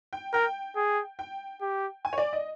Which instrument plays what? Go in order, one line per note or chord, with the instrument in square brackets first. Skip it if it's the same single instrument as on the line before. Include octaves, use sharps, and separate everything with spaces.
[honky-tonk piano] G5
[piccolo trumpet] A#4 [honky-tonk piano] G5
[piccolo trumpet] G#4
[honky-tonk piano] G5
[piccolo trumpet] G4
[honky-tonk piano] G#5
C#5
D5
D#5